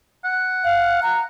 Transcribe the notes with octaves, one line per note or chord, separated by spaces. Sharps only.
F#5
F5
A#5